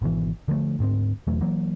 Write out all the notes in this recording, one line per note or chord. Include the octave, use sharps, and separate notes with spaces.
G#1 B2 E3
D3 F3 G3 A3
D2 G#2 G#3 C4
E1 E2 F#3 A3
E3 F#3 A#3